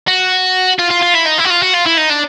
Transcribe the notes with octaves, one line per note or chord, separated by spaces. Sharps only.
F#4
F4
F4
F4
E4
D#4
E4
F#4
F4
F#4
F4
E4
D#4
D4